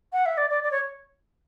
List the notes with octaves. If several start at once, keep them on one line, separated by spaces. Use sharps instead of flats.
F#5
E5
D5
D5
D5
C#5